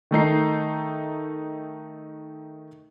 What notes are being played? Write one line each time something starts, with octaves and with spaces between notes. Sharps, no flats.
D#3 A3 D#4 C7